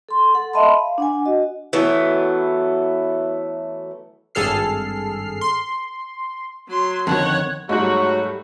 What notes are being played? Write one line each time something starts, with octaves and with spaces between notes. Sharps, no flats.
A4 C6
A4 F#5
D#5 E5 A5 B5 C6
F5
D4 F#5 G#5
F#4 D#5
E3 F#3 A3 B3
G#1 G2 G#4 A4 F6 C7
C6
F#3 C6
F2 D3 D#3 C#5 F#5
G#2 F#3 G3 A3 F#4